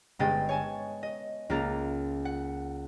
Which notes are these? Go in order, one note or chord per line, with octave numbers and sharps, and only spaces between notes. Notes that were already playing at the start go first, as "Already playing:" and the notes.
G1 G#3 B3 D#5 G5 A6
C#5 G#5 A5
D#5
C#2 A#3 F4 A#4 A#5 A6
F#5